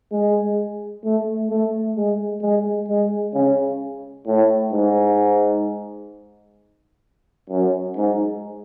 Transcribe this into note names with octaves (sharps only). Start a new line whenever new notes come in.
G#3
A3
A3
G#3
G#3
G#3
C#3
A2
G#2
F#2
G#2